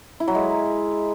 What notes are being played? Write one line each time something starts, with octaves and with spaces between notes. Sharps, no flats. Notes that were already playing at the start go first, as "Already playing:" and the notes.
E4
F#3
G#3